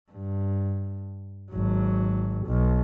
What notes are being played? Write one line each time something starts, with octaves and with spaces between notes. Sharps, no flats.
G2
G#1 F#3
B1